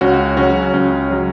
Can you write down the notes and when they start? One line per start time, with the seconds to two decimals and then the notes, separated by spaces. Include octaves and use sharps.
0.01 C#2 C#4 F#4
0.37 C#3 F#3 C#4 F#4
0.73 C#2 C#4
1.11 C#3 F#3